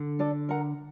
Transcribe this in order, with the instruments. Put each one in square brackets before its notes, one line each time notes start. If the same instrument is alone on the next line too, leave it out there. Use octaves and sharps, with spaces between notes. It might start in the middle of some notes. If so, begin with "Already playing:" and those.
Already playing: [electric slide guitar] D3
[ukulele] D4 A4 D5
A#4 F#5 A#5